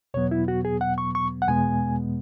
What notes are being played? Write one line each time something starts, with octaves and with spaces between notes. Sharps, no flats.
E2 B2 F#3 B3 C#5
E4
F#4
G#4
F#5
C#6
C#6
F#5
E2 B2 G#3 B3 G#5